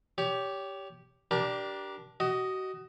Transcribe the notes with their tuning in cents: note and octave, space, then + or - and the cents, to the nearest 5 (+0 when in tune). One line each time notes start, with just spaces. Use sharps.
G4 +0 C#5 +30
D4 +0 G4 -15 A#4 +30
F#4 +30 D#5 +0